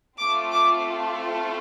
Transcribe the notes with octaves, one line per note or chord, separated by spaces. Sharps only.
A3 C4 F4 A4 D6
D6